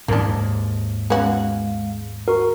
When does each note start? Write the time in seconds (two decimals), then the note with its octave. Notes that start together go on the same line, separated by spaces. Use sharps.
0.08 D#2 G#2 A#3 D4
1.10 G#3 B3 C#4 F#4 F5
2.28 F#4 A#4 C#6